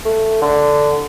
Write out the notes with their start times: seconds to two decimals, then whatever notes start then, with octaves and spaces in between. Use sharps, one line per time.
0.05 A3
0.42 D3